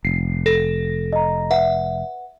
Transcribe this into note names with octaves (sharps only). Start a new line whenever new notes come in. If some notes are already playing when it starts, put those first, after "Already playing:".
F1 C7
A4 A#6
D#5 A#5
B4 E5 F#5